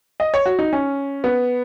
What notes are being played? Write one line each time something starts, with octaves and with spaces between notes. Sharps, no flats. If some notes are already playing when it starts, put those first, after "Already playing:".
D#5
C#5
F#4
D#4
C#4
B3